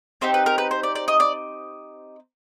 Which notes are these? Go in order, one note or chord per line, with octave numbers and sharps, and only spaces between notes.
C4 D#4 G4 C5
B4
A#4
B4
C5
D5
D5
D#5
D5